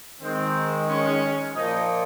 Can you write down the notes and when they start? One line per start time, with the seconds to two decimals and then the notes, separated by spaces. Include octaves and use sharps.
0.21 D#3 G#3 C4
0.88 C#4
1.55 A#2 F3 A#3 D#4